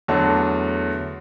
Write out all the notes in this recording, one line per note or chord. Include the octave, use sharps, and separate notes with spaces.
E2 D3 F#3 A3 A5